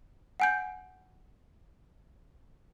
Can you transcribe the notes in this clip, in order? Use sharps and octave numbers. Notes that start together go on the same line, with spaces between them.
F#5 G#5 G6